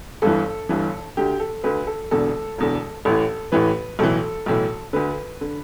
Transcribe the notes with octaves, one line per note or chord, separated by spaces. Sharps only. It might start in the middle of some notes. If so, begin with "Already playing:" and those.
G1 G2 E3 A4
G1 G2 E3
D2 D3 G4
A4
D2 D3 B4
A4
E1 E2 D3 A4
E1 E2 D3
A1 A2 E3 A4
A1 A2 E3 B4
B1 A2 E3 A4
B1 A2 E3
D2 D3 B4
D3